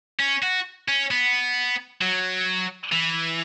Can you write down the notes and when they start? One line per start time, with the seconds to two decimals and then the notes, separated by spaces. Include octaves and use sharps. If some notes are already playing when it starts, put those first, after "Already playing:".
0.20 C#4
0.43 F#4
0.88 C#4
1.11 B3
2.02 F#3
2.92 E3